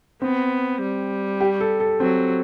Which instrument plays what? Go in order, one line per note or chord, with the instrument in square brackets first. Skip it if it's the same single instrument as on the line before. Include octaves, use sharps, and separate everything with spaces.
[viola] B3 [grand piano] C4
[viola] G3
[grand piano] G4
A4
A4
[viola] F#3 [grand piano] C4